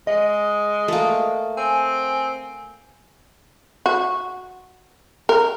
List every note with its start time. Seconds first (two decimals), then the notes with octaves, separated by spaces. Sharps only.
0.07 G#3 D#5
0.88 A3 A#3
1.57 C4 G#5
3.86 F#4
5.29 A#4